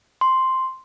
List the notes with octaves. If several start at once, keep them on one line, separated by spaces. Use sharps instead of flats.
C6